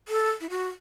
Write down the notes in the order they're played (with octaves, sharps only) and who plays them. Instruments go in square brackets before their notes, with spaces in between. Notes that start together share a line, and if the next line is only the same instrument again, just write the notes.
[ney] A4
E4
F#4